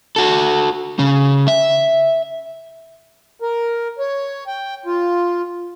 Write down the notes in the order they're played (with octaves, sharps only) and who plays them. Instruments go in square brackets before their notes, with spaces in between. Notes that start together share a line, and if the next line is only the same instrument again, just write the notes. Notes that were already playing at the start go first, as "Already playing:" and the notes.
[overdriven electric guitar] F#4 A4
C#3
E5
[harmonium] A#4
C#5
G5
F4